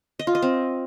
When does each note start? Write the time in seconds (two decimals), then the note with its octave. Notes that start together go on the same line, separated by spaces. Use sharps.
0.19 D#5
0.27 F4
0.35 D#5
0.42 C4